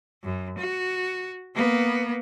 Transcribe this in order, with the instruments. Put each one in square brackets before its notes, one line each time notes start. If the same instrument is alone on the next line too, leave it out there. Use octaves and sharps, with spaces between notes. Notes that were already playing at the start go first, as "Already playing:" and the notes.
[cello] F#2
F#4
A#3 B3